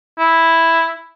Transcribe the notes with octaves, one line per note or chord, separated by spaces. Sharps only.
E4